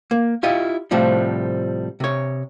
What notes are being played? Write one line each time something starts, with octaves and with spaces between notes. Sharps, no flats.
A#3
E4 F4 G4 D#5
A2 C3 F3 G3
C3 C#5